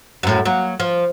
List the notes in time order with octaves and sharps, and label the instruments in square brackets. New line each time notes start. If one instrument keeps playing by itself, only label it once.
[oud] F#2 A2
F#3 A#3
F3